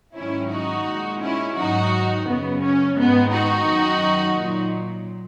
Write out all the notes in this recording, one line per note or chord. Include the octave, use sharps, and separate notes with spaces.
G#2 D#3 F#3 C#4 E4
D#4 F#4
A#2 G#3
C#4 E4
G#2 D#3 F#3 D#4 F#4
F#2 C#3 F#3 B3
C#4
G#2 D#3 G#3 B3
D#4 F#4
F#2 D#3 F#3
A#2 F#3